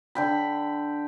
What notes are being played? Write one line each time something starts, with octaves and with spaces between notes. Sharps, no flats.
D3 G5 B5